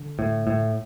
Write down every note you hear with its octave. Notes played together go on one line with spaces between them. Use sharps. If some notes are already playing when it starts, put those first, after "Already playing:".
Already playing: D3
A2
A2